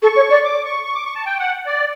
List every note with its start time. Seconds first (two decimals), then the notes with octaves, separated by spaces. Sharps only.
0.02 A4 C#6
0.16 C#5
0.30 D5
0.44 D6
0.65 C#6
0.85 C#6
0.95 D6
1.05 C#6
1.15 A5
1.26 G5
1.39 F#5
1.67 D5